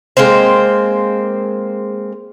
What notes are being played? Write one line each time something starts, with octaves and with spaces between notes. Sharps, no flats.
G#3 A#3 C4 C5